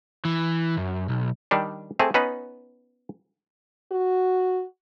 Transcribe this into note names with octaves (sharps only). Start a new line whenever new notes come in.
E3
F#2
B1
D#3 G3 D4
A3 C4 G#4
B3 C#4 D#4 B4
F#4